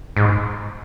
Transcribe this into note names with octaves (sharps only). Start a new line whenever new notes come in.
G#2